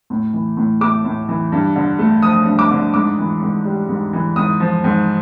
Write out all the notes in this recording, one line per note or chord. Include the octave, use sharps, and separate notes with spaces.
A2
E3
A2
A3 D6
A2
E3
G2
D3
A3
F3 D#6
G2
D6
D3
G#2 D6
E3
G#2
G3
G#2
E3
G#2 D#6
F3
G#2